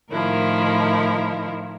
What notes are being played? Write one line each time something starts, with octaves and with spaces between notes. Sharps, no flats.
A2 D#3 F3 E4 A#4